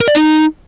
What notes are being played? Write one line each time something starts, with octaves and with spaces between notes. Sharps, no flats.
A#4
D5
D#4